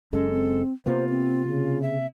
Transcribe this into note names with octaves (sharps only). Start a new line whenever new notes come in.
F#1 F#2 G#3 C#4 A4
C4
C3 A#3 B3 F4 C5
C4
C#3
E5